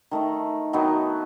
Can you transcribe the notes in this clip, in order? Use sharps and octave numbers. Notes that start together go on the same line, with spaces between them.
D#3 A3 D#4
D#3 F#3 B3 D#4